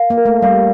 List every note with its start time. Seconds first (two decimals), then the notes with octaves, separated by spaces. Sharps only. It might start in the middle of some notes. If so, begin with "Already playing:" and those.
Already playing: A#4 F5
0.10 A#3
0.18 A#4
0.25 A3
0.42 G3 F5